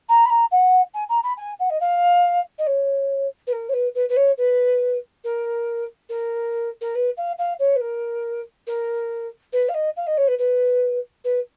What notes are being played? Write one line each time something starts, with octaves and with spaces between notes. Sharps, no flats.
A#5
B5
A#5
F#5
G#5
A#5
B5
G#5
F#5
D#5
F5
D#5
C#5
B4
A#4
C#5
B4
B4
B4
C#5
B4
A#4
A#4
A#4
B4
F5
F5
C#5
B4
A#4
A#4
B4
F5
D#5
F5
D#5
C#5
B4
B4
B4